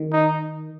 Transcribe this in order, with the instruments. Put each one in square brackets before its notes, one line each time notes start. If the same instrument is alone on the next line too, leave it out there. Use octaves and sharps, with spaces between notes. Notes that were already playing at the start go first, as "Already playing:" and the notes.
Already playing: [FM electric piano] D#3
[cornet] D#4